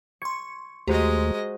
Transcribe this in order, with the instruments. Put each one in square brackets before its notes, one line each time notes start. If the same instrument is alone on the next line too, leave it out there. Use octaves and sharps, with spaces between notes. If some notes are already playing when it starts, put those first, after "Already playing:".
[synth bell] C6 C#7 [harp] C#6 G#6
[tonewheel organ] D#2 A3 [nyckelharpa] G#3 D#5 [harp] F#4 C5 A#5 [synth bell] G4